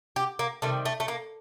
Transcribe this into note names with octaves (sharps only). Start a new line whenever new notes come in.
G4
A#3
C3 D#3 G3 A3
A3
A3
A#3